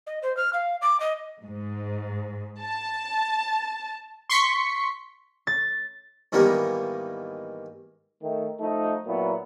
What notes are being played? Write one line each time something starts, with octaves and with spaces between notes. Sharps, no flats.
D#5
C5
F6
F5
D6
D#5
G#2
A5
C6 C#6 B6 C#7
A6
G#2 D#3 E3 G3 A#3 B3
D#3 A3
F3 A3 D#4
A#2 F#3 B3 E4